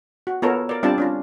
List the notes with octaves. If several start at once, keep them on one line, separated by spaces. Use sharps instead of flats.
F#4
B3 F4 A4 A#4 C#5
A#4 D5
G3 C4 D4 F4 D5 A5
C#4 D4 F4